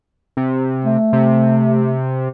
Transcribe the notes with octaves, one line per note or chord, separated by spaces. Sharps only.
C3
A3
C3